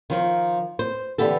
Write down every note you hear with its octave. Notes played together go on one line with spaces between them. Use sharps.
D#3 F3 A#4
C5
D3 E3 B3 G4 A4